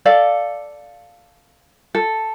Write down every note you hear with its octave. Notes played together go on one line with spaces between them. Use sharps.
A4 D5 F5
A4